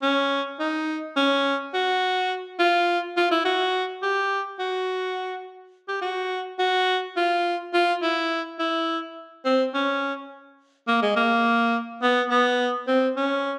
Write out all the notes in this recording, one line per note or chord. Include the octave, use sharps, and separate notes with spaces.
C#4
D#4
C#4
F#4
F4
F4
E4
F#4
G4
F#4
G4
F#4
F#4
F4
F4
E4
E4
C4
C#4
A#3
G#3
A#3
B3
B3
C4
C#4